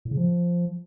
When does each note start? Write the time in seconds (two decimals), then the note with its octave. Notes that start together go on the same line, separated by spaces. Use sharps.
0.05 A2
0.11 C#3
0.17 F3